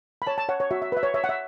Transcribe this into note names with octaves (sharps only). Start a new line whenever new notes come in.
B5
C#5 A5
A5
C#5 F#5
C#5
F#4 E5
E5
B4 E5
C#5
C#5 E5
F#5
E5